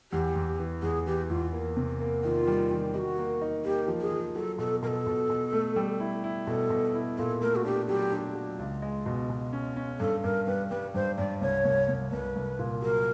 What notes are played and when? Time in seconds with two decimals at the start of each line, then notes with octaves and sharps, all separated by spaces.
0.12 E2 G4
0.35 E2
0.59 E3
0.82 E2 G#4
1.06 E3 G4
1.29 E2 F4
1.52 A#3
1.77 C3
2.00 A#3
2.23 D#3 F4
2.47 G3
2.71 D#3
2.94 D#4 F#4 G4
3.18 A#3
3.41 D#4
3.64 A#3 G4
3.88 F3
4.01 G#4
4.12 F3
4.35 F#3 A4
4.58 B2 A4
4.83 B2 A#4
4.87 A4
5.07 B2
5.30 B2
5.53 A3
5.76 G3
6.00 E4
6.24 E4
6.47 B2 A4
6.70 B2
6.94 E4
7.18 A#2 A4
7.41 A3 A#4
7.56 F#4
7.65 D4 G4
7.88 F#3 G4
8.12 D4
8.35 F#3
8.59 C#2
8.82 G#3
9.06 B2
9.30 B2
9.53 C#4
9.77 C#4
10.00 G2 A4
10.24 G2 A#4
10.47 G3 B4
10.70 G3 B4
10.95 G2 C5
11.18 G2 D5
11.41 C2 C#5
11.65 C2
11.88 C2
12.12 C2 B4
12.36 C2
12.59 A#2
12.82 F#3 A#4